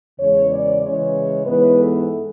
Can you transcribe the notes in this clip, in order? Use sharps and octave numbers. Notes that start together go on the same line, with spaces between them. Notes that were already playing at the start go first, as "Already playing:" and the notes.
E2 C#3 G#3 C#5
D5
C#3 E3 G#3 C#5
G#2 E3 G#3 B3 B4
A4